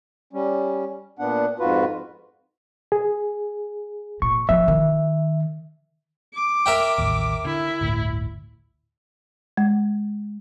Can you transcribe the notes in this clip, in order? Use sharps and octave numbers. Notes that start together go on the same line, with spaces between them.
G3 C#4
A#2 B3 D4 F#5
F2 G#2 F4 F#4 B4
G#4
A#2 C#6
F3 C#4 E5
D#3
D6
A#4 E5 G5
A1 D#2
D3 E4
G1 D2 A2
G#3